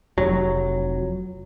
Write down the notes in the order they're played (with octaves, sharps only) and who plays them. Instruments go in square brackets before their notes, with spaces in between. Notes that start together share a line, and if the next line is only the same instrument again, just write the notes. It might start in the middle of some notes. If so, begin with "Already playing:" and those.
[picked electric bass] F1 F#3